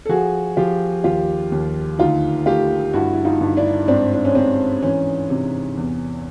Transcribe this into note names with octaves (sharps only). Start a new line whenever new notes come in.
A4
F3 F#4 G#4
F3 F4 G4
D#2 F4 G4
D#2
D2 D#4 F4
A3 F4 G4
G2 E4 F#4
E4
D#4 F4
G2
D4 E4
G#2 C4 D4
D4
C#4
G#2 C4
E3 C#4
C3
E2